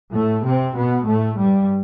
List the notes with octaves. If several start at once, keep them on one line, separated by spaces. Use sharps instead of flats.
A2 A3
C3 C4
B2 B3
A2 A3
G2 G3